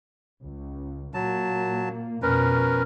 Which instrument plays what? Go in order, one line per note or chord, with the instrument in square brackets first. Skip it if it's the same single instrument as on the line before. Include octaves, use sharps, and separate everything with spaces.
[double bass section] C#2
[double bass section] A#2 A#3 [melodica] F#3 A5
[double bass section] F2 B2 [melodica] C#4 A#4 B4